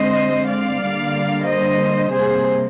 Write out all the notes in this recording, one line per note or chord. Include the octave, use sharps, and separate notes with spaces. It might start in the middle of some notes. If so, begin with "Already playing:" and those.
Already playing: D3 G#3 C4 C5 D#5
D5 F5
D3 G3 A#3
C5 D#5
C3 G3 A#3 G#4 C5